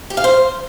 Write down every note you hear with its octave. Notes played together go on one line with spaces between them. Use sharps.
G4
F5
C5